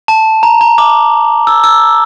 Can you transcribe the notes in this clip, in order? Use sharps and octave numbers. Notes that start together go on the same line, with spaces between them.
A5
A#5
A#5
D6
E6
E6